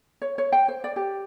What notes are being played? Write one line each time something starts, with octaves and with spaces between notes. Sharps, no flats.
C#5
C#5
G5
C5
D5
G4